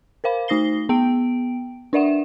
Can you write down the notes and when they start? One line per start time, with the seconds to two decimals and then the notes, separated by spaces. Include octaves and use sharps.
0.24 A#4 C5 F5 B5
0.48 A3 D#4 D#6 A#6 C7 G7
0.89 B3 G5 D7
1.93 D4 A#4 D5 E5 F#5 E7